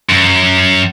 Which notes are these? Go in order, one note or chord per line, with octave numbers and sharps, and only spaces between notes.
F#2